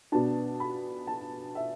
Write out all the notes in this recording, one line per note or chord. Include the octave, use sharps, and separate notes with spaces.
B2 B3 D4 A5
B5
A5
E5